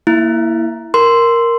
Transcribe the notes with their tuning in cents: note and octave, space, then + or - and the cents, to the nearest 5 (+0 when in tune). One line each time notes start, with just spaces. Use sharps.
A#3 +0 E4 +0 F5 -40
A#4 +0 C6 -5